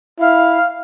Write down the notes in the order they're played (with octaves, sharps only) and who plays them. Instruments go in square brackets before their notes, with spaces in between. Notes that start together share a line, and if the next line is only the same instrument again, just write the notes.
[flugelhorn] E4 [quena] F5